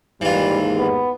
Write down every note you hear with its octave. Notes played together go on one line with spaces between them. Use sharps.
D#2 G#2 E3 G3 F4
B3